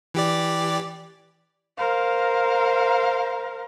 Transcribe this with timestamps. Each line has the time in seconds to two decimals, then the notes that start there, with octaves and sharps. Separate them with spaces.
0.14 E3 G4 D5
1.77 A#4 C5 F5 A#5